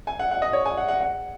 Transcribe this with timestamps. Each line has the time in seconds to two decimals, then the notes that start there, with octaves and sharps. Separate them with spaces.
0.07 G#5
0.19 F#5
0.31 F#5
0.42 D#5
0.53 C#5
0.65 G#5
0.77 F#5
0.88 F#5
1.01 F#5